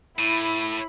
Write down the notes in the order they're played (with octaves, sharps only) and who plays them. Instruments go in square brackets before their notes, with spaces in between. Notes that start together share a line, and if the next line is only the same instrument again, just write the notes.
[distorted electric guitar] A2 [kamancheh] E4 B5